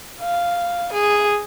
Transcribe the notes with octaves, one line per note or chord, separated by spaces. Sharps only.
F5
G#4